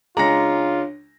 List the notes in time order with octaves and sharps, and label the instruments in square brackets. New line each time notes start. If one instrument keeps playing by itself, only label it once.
[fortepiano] C#2 G#3 [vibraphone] D4 C#5 [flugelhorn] F4 [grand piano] A#5 A#6